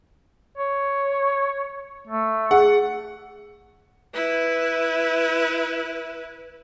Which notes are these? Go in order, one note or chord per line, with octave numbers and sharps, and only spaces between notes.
C#5
A3
G#4 F#5
E4 B4